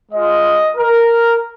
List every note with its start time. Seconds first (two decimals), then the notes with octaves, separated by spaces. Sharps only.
0.12 G#3 F4 D#5
0.77 A#4